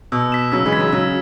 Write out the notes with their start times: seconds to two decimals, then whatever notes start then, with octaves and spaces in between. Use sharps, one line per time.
0.12 B2 E6
0.32 B6 E7
0.52 C#3 F#3 E6
0.66 E3 G#3
0.73 G#6 B6
0.79 C#3 F#3
0.92 C#3 F#3 E6